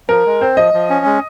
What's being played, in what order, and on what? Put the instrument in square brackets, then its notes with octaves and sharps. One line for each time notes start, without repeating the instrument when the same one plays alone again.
[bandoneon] F3 [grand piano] A#4
[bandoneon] G#3
[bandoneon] C4 [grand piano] C5
[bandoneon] F3 [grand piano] D#5
[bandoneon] F3
C#4
G#3